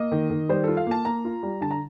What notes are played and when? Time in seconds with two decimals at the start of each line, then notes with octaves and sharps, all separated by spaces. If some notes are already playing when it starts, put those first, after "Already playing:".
Already playing: A#3 D#5
0.12 D#3
0.30 D#3
0.49 G3 C5
0.64 F4 A4
0.77 F5
0.87 A#3 A5
1.05 A#3 A#5
1.25 F4
1.43 G3
1.61 D3 A5
1.71 A#5